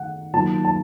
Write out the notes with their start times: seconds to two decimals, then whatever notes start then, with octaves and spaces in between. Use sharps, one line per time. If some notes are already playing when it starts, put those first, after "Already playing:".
Already playing: D#3 A3 D#4 F#5
0.33 D#3 F#3 A#3 F4 A5
0.65 A5